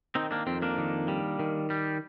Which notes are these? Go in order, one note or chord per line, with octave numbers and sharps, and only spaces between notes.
D#3 C4 D#4
A#3 D4
F2 C4
A#3 D4
D#3
G3
D#3
G3